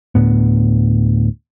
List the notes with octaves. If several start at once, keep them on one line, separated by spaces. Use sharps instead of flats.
D2 A2 B3